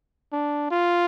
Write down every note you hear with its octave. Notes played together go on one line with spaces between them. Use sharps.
D4
F4